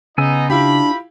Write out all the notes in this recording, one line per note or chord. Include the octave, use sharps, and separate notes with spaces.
C#3 B3 D#4 D#5 G#5 E6
D4 E4 F4 G4 B5